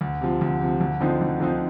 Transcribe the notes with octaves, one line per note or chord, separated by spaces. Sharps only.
D2
C3 F3
D2
C3 F3
D2
D3 F3 C4 D#4
D2
D3 F3 C4 D#4